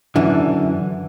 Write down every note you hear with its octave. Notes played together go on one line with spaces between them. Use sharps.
F#2 D3 E3